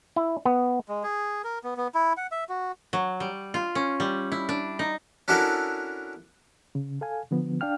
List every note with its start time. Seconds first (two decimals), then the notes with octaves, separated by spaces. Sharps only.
0.16 E4
0.45 B3
0.89 G#3
1.03 G#4
1.44 A#4
1.64 B3
1.77 B3
1.95 E4
2.17 F#5
2.32 E5
2.49 F#4
2.93 F#3
3.20 G3
3.54 F4
3.75 C#4
4.00 G3
4.32 E4
4.49 D4
4.79 D#4
5.28 C#4 D4 E4 F#4 A4 A#4
6.75 C#3
7.01 A4 F5 G#5
7.31 D3 F3 B3
7.61 D4 F5 G5 F6